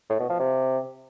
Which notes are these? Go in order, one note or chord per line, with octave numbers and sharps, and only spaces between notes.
A2
B2
F3
C3